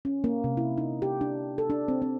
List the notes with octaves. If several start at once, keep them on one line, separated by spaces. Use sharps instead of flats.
C#4
A#3
C3
E4
D#4
G4
D4
A4
D4
C4
C4